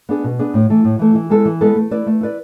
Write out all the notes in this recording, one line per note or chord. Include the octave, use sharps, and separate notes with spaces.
B3 D4 G#4
B2
B3 D4 G#4
A2
E3 A3
A2
E3 A3
E3
G#3 B3 E4 A4
E3
G#3 B3 E4 A4
A3
E4 B4 D5
A3
E4 B4 D5